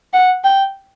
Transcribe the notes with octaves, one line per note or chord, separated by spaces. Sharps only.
F#5
G5